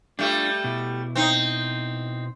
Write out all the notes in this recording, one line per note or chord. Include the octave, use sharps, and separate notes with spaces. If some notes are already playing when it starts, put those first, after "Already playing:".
G3 A3 D4 F4
B2 E4
C4 D#4